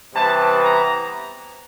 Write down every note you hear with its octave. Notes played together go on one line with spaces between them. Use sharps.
C3 E3 G3 B3 A5
A#5